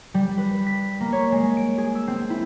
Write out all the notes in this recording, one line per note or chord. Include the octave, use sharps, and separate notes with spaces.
G3
B4
B6
A#3
C#5
G#3
D7
G#4
E6
C4
E4